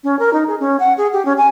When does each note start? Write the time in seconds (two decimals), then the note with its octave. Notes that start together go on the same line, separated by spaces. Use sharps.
0.04 C#4
0.19 A#4
0.33 D#4
0.48 G#4
0.60 C#4
0.80 F#5
0.98 G#4
1.13 G4
1.25 C#4
1.38 G#5